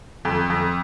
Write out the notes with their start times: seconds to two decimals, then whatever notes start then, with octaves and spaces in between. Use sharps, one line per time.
0.25 F2
0.50 F2